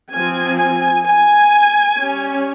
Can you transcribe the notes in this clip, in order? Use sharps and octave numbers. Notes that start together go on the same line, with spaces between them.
F3 C4 G#5
G#5
G#5
G3 C#4